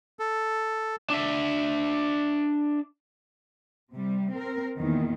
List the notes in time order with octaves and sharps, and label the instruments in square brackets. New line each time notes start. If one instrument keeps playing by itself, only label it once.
[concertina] A4
[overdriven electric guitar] D4 E5
[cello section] C3 G3
C4 A#4
E2 A#2 D#3